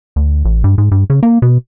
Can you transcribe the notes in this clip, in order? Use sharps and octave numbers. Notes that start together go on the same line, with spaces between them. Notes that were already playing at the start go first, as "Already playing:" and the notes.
D2
A1
G2
G#2
G2
C#3
A#3
B2